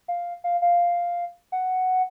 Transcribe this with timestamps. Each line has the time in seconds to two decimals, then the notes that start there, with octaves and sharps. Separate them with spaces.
0.08 F5
0.44 F5
0.62 F5
1.52 F#5